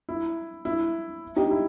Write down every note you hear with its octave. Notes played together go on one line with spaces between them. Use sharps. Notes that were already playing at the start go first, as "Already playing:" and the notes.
E4
E4
D#4 G4
E4